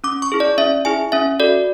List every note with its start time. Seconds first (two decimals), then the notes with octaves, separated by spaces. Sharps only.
0.04 C#4 D6
0.22 C#6
0.32 E4 G#4
0.40 D5
0.58 C#4 E5
0.85 E4 G#4 G#5
1.12 C#4 E5
1.40 F#4 A4 D5